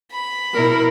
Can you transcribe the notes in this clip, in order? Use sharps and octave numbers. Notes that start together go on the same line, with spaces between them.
B5
B2 E4 A#4